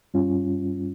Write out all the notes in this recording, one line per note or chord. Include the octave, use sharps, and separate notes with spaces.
G2 G3 C#4 F4